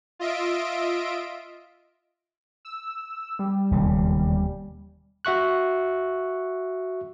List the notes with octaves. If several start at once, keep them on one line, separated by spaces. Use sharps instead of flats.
F4 D#5 E5 D7
E6
G3
E1 D#2 C#3
F#4 E5 C#6 F#6